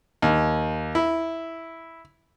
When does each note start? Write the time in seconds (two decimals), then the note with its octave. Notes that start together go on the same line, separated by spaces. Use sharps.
0.22 D#2
0.95 E4